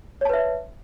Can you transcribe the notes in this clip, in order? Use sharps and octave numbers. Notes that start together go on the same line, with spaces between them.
B4 C#5 E5 A5